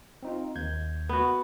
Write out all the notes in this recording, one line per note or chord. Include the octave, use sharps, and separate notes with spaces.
C4 D#4 F4
D#2 G6 G#6
B3 F#4